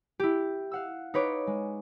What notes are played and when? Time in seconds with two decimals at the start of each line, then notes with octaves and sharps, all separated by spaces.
0.19 E4 G4
0.72 F5 F#5 E6
1.14 D#4 B4 C#5 D6
1.47 G#3